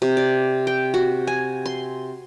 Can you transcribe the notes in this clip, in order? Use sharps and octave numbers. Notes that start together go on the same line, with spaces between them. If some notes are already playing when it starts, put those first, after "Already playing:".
C3
D5
G5
F#4
G#5
C6